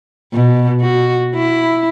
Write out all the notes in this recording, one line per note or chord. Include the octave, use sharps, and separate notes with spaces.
B2
F#4
E4